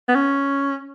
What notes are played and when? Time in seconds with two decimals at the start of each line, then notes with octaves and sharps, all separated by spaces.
0.09 B3
0.15 C#4